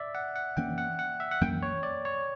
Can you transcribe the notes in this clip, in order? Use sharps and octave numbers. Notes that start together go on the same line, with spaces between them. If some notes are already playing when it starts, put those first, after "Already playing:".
Already playing: D5 E5
F#5
F#5
F#2 E3 A#3 C#4 G5
F#5
F#5
E5
F#5
F#2 E3 A#3 C#4 G5
C#5
D5
C#5